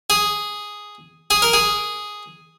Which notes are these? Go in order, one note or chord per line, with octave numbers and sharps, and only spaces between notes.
G#4
G#4
A#4
G#4